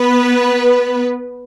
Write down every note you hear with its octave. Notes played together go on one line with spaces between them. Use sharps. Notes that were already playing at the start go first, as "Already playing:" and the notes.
Already playing: B3 B4